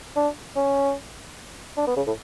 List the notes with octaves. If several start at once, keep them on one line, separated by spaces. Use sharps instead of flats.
D4
C#4
D4
B3
C#3
A2